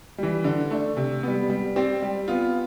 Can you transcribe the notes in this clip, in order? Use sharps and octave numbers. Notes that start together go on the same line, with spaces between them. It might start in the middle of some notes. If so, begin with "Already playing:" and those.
E3 G3
D3
A3 D4
C3
G3 B3
G3
C4 G4 D5
G3
B3 F4